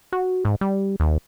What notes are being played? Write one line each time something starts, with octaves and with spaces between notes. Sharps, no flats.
F#4
G#2
G3
D#2